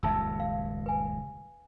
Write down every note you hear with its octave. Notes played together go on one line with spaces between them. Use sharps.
D#1 C#2 F#2 E5 A5 E6
F5
B4 G#5